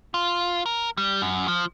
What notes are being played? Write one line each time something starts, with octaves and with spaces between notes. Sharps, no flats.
F4
A#4
G3
F#2
F3